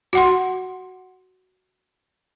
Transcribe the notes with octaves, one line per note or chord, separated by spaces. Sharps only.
F#4 F#5 C6